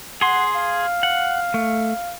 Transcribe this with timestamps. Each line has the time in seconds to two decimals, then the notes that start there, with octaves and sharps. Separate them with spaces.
0.21 G#4 F#5 C6
0.56 F5
1.03 F#5
1.54 A3